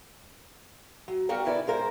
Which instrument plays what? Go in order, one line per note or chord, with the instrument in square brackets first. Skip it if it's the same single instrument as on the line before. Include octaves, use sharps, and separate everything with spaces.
[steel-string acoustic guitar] F#3
G3 B3 F#4 G4 A#4 F5
C#3 B3 E4 B4 D5
G#3 F4 A#4 C5